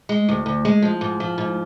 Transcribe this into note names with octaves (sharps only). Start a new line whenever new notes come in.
G#3
D2
D2
G#3
F3
G#2
F3
G#2